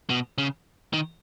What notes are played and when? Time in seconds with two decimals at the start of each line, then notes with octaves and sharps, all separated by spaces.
0.10 B2
0.38 C#3
0.93 D#3